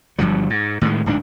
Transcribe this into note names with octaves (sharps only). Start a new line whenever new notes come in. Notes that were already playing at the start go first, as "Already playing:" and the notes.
G1 G2 F3 F#3
G#2
A2 D#3 G3 G#3
D1 G#2 G3 D4